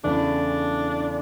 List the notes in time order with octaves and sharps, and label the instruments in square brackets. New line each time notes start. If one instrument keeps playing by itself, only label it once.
[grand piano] E2 C#3 E3 A3 [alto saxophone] D4